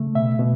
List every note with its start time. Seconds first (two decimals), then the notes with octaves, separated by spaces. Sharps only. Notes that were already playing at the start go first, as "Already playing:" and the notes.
Already playing: C#3 A3
0.15 B2 E5
0.39 B2